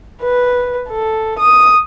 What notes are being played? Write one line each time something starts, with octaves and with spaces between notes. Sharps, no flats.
B4
A4
D#6